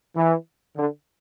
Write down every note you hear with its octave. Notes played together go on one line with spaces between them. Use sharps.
E3
D3